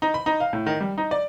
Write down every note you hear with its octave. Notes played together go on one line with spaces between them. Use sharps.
D#4
B5
D#4
F5
A2
D#3
G3
D#4
D5